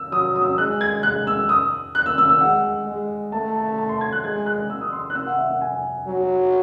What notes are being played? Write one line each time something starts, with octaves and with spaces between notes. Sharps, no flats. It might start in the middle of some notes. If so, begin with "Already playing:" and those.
Already playing: E6
F#3 D#6
D#6
E6
G#3 F#6
G#6
G#3 F#6
E6
D#6
F#6
E6
E6
E6
G#3 F#5
G#3
A3 A5
A5
A5
C6
G#6
F#6
G#3 G#6
F#6
E6
D#6
C6
F#6
E6
F#5
E5
F#5
G#5
F#3